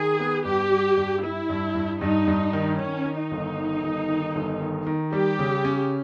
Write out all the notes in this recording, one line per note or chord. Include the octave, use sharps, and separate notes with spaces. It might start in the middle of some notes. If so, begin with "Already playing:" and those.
Already playing: D#3 G#4
B3
G2 G4
G3
G2
G3 E4
G2
G2
G2 D#4
G2
D#3
D#3 C#4
D#3
D#4
G1
D#3
G1
D#3
G1
D#3
D#3
G3 G4
C#3
C#4